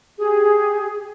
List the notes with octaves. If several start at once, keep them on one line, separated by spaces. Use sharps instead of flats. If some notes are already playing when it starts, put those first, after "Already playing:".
G4 G#4